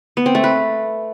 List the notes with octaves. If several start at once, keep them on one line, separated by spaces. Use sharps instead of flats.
B3
C4
A3
B4